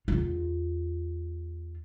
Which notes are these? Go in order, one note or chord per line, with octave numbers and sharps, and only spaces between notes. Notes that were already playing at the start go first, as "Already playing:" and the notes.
E2 F4